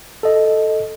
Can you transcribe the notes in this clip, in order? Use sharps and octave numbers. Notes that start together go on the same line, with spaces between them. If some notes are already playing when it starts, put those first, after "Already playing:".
A4 D#5